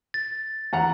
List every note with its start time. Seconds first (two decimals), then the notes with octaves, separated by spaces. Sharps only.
0.14 A6
0.73 E2 F#5 A#5